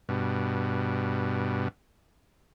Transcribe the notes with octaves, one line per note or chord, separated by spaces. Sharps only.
G2 B2